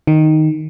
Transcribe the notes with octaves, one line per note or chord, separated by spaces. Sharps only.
D#3